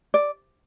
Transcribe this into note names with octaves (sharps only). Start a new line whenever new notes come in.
D5